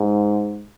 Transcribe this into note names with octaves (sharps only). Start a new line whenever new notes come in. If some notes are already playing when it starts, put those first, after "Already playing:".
Already playing: G#2